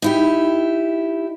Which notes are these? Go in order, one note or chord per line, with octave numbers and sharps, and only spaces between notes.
D#4 E4 G4